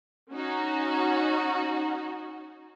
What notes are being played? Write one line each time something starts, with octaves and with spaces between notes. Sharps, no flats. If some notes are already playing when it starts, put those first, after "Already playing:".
C#4 D#4 F#4